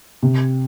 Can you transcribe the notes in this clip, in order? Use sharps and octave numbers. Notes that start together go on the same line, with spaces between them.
C3